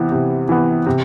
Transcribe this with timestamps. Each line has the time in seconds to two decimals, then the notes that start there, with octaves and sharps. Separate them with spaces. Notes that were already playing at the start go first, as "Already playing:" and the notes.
Already playing: C3 E3 B3
0.12 C3
0.49 E3 B3
0.86 C3